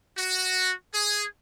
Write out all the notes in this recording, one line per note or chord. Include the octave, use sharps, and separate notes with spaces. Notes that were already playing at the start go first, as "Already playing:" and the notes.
F#4
G#4